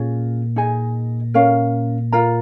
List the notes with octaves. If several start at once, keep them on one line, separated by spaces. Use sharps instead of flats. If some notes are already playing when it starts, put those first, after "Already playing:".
Already playing: A#2 C#4 F4 G#4
D#4 G#4 D#5 G#5
C#4 A#4 F5
F4 A#4 F5 A#5